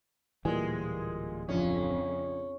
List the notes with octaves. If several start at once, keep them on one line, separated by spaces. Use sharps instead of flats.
D1 A#2 E3 G3 G#3 G#5
A#1 F2 C#3 C#4 F4